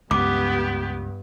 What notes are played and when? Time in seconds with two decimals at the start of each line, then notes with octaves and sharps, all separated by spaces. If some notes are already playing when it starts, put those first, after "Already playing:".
0.11 C#2 G2 B3 G4 D6